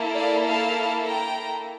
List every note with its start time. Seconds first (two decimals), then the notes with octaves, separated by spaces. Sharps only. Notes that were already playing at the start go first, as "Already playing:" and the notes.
Already playing: A#3 E4 A4
0.14 D5 F5
0.45 F5 A5
1.06 G5 A#5